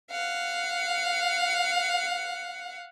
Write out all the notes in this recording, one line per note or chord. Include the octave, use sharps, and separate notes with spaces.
F5 F#5